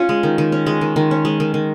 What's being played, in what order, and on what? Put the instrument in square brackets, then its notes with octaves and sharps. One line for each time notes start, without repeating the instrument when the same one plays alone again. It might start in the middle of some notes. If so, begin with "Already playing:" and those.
Already playing: [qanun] C#4 [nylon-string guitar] F4
[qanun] G#3
D#3
D#3
C#4
G#3
D#3
D#3
C#4
G#3
D#3
D#3